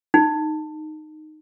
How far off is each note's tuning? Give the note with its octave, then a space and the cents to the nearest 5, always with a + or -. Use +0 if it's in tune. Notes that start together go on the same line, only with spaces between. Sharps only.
D#4 -10